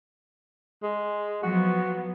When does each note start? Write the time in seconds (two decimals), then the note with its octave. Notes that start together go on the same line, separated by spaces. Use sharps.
0.83 G#3
1.43 F3 F#3 B3 F#4